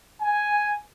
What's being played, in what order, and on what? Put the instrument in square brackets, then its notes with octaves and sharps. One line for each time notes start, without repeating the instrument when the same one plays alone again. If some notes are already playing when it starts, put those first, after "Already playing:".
[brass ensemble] G#5